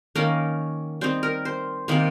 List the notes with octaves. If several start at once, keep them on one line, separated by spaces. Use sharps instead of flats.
D#3 A#3 C#4 A#4
G3 C4 D#4 C5
A#4
C5
C3 D#3 A#3